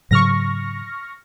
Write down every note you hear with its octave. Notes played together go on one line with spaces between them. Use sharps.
G#2 C#3 F#3 C#6 F6 A#6